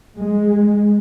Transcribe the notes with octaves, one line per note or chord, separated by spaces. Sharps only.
G#3